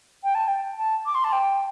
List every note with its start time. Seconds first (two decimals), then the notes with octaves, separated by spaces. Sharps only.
0.24 G5
0.35 A5
0.48 G5
0.79 A5
1.06 D6
1.15 C6
1.24 A5
1.32 G5